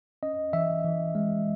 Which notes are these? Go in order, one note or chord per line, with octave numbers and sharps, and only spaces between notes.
C#4 D#5
E3 E5
E3
G#3